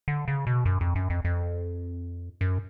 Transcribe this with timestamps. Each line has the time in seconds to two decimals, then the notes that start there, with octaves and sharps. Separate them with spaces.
0.08 D3
0.28 C#3
0.47 B2
0.65 F#2
0.81 F2
0.96 F#2
1.10 F2
1.25 F2
2.41 F#2